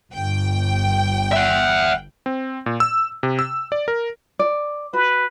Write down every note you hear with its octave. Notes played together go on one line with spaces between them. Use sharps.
G1 G5
E5 F#5
C4
A#2
E6
C3
E6
D5
A#4
D5
F#4 B4